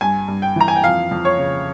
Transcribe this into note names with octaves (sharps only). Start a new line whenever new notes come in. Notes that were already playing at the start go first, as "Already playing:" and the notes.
G2 G#5
G2
G5
E3 A#5
G#5
G5
F2 F5
F2
C#5
C#3